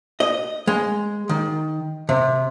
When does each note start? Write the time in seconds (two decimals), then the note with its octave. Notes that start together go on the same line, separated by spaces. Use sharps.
0.20 D#5
0.67 G#3
1.29 D#3
2.09 C3